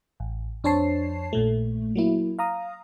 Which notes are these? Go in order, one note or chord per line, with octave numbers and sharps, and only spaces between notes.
A1
F2 D4 C5 C#5 A5 C7
A#1 A#2 A3
F#3 A#3 E4
F5 A#5 D#6